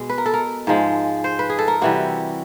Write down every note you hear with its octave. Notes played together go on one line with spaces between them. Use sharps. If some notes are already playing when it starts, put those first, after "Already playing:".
Already playing: B2 G#3
B4
A#4
A4
A#4
G#2 F3 G#3
C5
B4
G#4
A4
A#4
C3 E3 G3 F#4